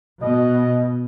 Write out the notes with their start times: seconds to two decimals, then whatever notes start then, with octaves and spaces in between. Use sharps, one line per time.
0.22 B2 D#5